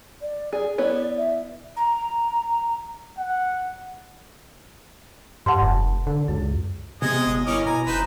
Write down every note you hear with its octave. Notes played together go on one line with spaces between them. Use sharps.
D5
G#4
B3 E4 C#5 D5
E5
A#5
F#5
G2 F#5 A5 C6
F1
D3
C#2 F#2
C3 G#3 B3 G#4 D#5
G1 D#6
C#4 E4 A#4 D#5 D6
B2 G#5 A#5
F#1 D#4 B4 C5